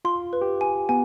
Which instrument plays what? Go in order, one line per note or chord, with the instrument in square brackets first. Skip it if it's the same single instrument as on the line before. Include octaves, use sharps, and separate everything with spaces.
[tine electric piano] F4 [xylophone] C6
[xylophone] B4
[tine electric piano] G4
[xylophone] G#5
[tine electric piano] B3 [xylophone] G#5